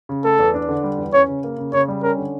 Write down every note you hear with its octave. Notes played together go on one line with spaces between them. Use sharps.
C#3
A3 A4
E2
D4
D3
G3
E2
C#4 C#5
C#3
A#3
C#3
C#3 C#5
G3
C#4 A#4
D3